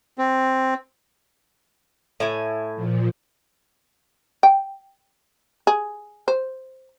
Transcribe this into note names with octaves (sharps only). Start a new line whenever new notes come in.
C4
A2 E4 G#5
A#2 F3
G5
G#4
C5